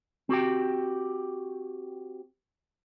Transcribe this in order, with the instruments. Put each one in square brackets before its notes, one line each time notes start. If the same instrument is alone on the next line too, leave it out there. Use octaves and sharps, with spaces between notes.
[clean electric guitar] C4 F#4 G4 G5